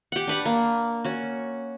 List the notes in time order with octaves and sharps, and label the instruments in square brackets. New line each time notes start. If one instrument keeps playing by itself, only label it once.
[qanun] G4 F#5
D4 B4 F#5
A#3
C#4 F#4